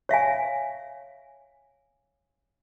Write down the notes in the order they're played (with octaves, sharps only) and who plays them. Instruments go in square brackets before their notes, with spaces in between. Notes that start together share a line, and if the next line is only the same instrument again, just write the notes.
[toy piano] C#5 E5 F5 G#5